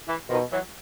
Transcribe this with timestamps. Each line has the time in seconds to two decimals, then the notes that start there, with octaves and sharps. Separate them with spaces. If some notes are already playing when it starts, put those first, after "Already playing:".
0.08 E3
0.29 B2 D#3 F3
0.52 E3 F#3